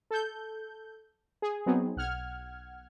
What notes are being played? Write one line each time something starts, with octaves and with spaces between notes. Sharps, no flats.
A4 G6
G#4
F#3 B3 C4 D#4 G#4
B1 F#5 F6 G#6